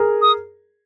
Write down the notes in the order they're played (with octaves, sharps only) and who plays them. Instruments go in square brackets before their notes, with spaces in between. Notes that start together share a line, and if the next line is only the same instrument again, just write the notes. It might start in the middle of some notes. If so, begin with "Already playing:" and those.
Already playing: [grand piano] G#4 A#4
[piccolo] D#6